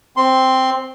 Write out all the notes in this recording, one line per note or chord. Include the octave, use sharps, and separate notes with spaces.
C4 C6